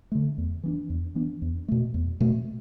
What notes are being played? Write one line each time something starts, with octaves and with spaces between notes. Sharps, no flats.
D3 A3
E2
E3 B3 D4
E2
E3 B3 D4
E2
B2 A3
E2
B2 A3